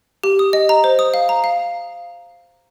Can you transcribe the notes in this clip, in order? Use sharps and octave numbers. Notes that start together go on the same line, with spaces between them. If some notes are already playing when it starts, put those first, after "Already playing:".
G4
D#6
D#5
A#5
C5
D#6
F5
A#5
F5